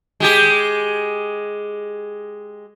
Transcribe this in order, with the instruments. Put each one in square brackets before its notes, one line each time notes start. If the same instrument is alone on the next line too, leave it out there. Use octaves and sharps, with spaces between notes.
[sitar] G#3 G4 G#4